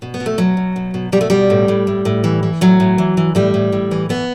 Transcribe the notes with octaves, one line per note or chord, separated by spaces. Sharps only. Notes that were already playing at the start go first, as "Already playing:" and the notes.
B2
B3
B2
A3
B2 F#3
B2
B2
B2
B2 G3
A3
B2 G3
A2
A2
A2
A2
E3
E3
A2 F#3
A2
E3
E3
A2 G3
A2
A2
E3
E3 B3